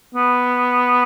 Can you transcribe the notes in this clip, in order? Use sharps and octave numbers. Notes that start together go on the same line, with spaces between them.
B3